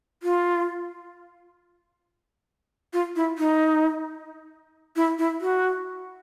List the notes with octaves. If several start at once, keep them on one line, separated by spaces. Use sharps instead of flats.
F4
F4
E4
D#4
E4
E4
F#4